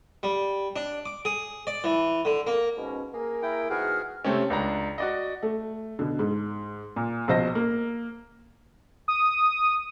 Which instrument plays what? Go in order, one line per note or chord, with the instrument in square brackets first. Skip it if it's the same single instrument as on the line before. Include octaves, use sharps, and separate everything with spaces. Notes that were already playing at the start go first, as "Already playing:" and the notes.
[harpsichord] G3
D4
D6
G#4
D5
E3
D3
A#3
[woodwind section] G#2 B2 C#4
A#3 G#4 A#4
[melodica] E4 G5
[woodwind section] E2 G#2 F6 [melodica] F#4 G#4
[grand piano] C3 A3 C4 C#4
C#2 D4 A#5
F#4 D5 D#5
[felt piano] A3
B2 D3
G#2
A#2
A#1 B2 C5 D#5 A#6
A#3
[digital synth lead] D#6